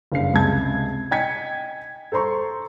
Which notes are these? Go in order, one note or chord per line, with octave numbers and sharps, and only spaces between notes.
F#1 G2 F5 C7
C#2 C3 A5 G#6
D#5 G5 G#5 G#6 B6 C#7
A4 C5 A#5 C6 C#6